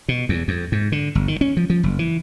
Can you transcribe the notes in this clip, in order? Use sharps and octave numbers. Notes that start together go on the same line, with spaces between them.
B2
E2
F2
G#2
D3
G1
D#3
C#4
F3
F3
F#1
E3